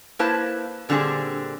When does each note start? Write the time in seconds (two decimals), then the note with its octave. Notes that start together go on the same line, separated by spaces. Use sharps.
0.19 A#3 E4 B4 C5 A5
0.89 A#2 D3 G3 C4 D4 G#4